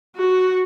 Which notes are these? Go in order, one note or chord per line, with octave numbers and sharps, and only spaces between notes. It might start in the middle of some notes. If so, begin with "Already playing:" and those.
F#4